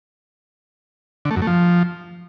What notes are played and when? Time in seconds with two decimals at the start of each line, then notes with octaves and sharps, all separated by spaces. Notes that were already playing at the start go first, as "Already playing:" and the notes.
1.25 D3
1.31 A3
1.36 F#2
1.42 A3
1.47 F3